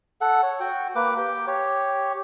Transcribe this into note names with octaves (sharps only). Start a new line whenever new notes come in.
A4 F#5
C#5
F#4 G5
A#3 B4 D6
G4 G5
G4 C#5